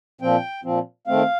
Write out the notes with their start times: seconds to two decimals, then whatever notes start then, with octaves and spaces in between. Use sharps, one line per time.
0.21 A#2 F3 C4 G5
0.64 A#2 F3 C4
1.07 D#3 A3 C4 F5